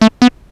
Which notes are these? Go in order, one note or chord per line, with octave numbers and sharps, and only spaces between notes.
A3
B3